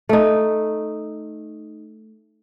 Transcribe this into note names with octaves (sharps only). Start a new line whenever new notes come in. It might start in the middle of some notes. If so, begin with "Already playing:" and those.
A3 D#4